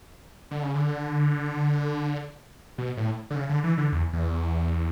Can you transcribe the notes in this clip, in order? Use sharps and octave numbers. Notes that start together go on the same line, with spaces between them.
D3
C#3
D3
B2
A2
D3
C#3
D3
E3
D3
E2
E2